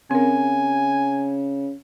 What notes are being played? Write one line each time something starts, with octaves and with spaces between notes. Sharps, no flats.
C#3 C4 A#4 G#5